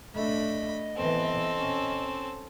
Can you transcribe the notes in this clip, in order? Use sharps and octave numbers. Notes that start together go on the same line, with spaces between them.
A3 D4 D#5 B5
E3 B3 C4 A4
C#4